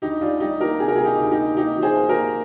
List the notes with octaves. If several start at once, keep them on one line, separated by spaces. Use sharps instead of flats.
D2 D#4 G4
D2 D4 F4
G3 D#4 G4
A#3 G4 A#4
C3 G#4
A#4
A#3 F4 G#4
D#4 G4
D2
D#4 G4
C3
A#3 D#4 G4
F3
G#4 C5
A#3
G4 A#4
A#3